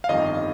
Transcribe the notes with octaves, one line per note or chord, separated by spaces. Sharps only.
F5
G1 F2 D#3 G3 D#5